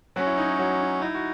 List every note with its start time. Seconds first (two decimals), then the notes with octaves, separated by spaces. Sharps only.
0.16 F#3 C#4 F#4
0.27 E4
0.38 D#4
0.48 E4
0.59 F#3 F#4
0.81 D#4
1.02 D#4 E4
1.15 F#4